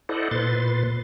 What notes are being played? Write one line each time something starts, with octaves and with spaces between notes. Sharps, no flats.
E4 A4 C5 D5 D#5 F#5
A#2 B4 C6 A6